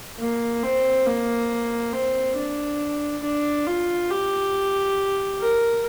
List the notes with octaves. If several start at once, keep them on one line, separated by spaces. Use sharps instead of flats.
A#3
C4
A#3
C4
D4
D4
F4
G4
A#4